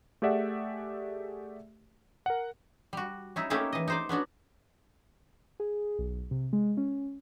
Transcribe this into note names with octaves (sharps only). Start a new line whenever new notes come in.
A3 G4 G#4 D5 E5 F#5
A#4 F#5
G3 F#4
C#4 D#4 E4
A3 A#3 C#4 D#4 E4 G4
E3 D#5
D#4 C5 D5
B3 C#4 D4 F#4
G#4
B1
C3
G#3
C#4